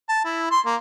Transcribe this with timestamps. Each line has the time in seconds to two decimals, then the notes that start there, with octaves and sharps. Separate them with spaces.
0.09 A5
0.25 E4
0.51 C6
0.66 A#3